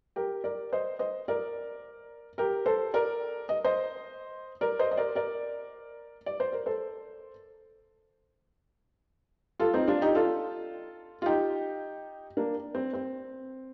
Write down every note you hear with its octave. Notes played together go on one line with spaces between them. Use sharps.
G4 A#4
A#4 D5
C5 D#5
C5 D#5
A#4 D5
G4 A#4
A4 C5
A#4 D5
D#5
C5 D#5
A#4 D5
C5 D#5
D#5
A#4 D5
A#4 D5
D5
C5
A#4
A4 C5
F4 A4
C4 D#4
D4 F4
D#4 G4
F4 A4
F4
D#4 G4
A#3 D4
C4
C4